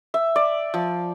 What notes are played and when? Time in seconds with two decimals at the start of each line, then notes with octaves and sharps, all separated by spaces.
0.14 E5
0.36 D5
0.74 F3